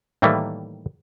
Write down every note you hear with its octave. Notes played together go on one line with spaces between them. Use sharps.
A2 D#3 E3 G3 A3 A#3